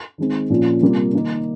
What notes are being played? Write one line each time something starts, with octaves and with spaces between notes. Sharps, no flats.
D#3 G#3 C4
A#2 F3 A#3 C#4 F4
C3 G3 A#3 F4
D#3 A#3 D#4